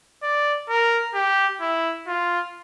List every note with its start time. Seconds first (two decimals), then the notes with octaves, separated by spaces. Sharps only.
0.23 D5
0.69 A#4
1.15 G4
1.61 E4
2.08 F4